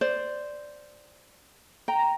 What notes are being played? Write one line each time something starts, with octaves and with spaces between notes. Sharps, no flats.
C5 D5
G5 A#5